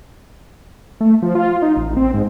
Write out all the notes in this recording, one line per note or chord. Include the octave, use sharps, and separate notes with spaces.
A3
F3
F4
D#4
A1
C4
G#2